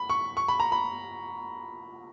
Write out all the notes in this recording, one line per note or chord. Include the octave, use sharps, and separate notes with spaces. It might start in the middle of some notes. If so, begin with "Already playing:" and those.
Already playing: B5
C#6
C#6
B5
A#5
B5